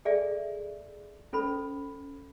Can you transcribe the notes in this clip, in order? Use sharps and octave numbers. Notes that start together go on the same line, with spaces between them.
G#4 A4 D5 E5 G#5
C#4 A4 C5 B5